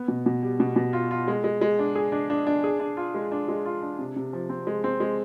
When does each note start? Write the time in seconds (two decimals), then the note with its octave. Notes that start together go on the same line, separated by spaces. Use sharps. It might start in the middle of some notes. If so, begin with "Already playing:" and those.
Already playing: B3
0.08 B2
0.26 B2
0.43 G3
0.60 B2
0.76 B2
0.93 F4
1.11 F4
1.28 G#3
1.44 G#3
1.61 G#3
1.79 D4
1.95 G#4
2.12 D4
2.30 D4
2.47 D4
2.64 G#4
2.80 D4
2.97 F4
3.15 G#3
3.32 D4
3.48 G#3
3.66 F4
3.82 D4
3.99 C3
4.16 C3
4.33 F3
4.49 C4
4.67 G#3
4.84 C4
5.00 G#3